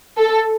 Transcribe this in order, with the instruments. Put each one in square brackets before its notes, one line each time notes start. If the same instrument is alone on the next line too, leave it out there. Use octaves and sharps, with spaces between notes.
[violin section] A4